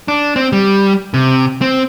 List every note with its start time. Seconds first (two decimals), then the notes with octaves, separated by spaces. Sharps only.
0.08 D4
0.36 C4
0.53 G3
1.14 C3
1.61 C4